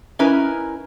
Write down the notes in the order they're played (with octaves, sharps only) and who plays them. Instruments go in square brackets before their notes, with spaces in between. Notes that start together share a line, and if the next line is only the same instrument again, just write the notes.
[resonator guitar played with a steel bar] C#4 D#4 E4 A#4 B4 G#5